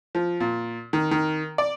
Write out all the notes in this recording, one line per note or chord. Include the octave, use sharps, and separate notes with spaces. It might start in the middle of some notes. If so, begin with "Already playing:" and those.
F3
A#2
D#3
D#3
D5